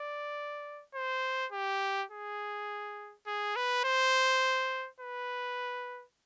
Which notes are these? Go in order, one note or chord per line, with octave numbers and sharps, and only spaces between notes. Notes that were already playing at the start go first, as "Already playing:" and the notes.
Already playing: D5
C5
G4
G#4
G#4
B4
C5
B4